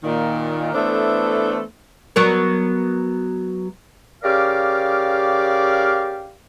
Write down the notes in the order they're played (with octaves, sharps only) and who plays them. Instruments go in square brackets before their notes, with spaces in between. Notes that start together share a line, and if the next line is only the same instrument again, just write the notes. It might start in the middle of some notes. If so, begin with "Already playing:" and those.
[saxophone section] A#2 D#3
E3 A3 B3 D4 A4 C5
[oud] F#3 B3 A#4
[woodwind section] C#3 G4 A#4 D5 F5